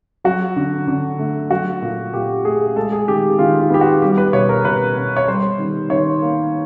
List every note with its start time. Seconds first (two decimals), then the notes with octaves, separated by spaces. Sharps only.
0.24 F#3 F#4
0.56 D3
0.88 D3
1.19 A3
1.50 F#3 F#4
1.82 A#2
2.13 A#2 G4
2.45 A3 G#4
2.76 G#3 A4
2.92 G#4
3.08 D#3 G4
3.39 D#3 F4
3.61 F4
3.70 B3 G4
3.81 F#4
4.02 G3 G4
4.18 B4
4.33 B2 C#5
4.49 A#4
4.65 B2 B4
4.96 B3
5.16 C#5
5.28 G3 C5
5.59 D#3
5.90 D#3 C#5
6.22 A#3